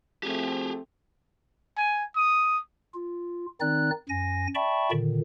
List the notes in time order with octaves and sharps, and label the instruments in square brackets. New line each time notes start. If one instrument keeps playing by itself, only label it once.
[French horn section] F3 A3 C4 [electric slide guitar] G4 G#4
[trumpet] G#5
D#6
[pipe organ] F4
D#3 C4 D#4 D5 F#6
F#2 G#5 A#6
D5 E5 G5 A5 B5 C#6
A#2 D3 D#3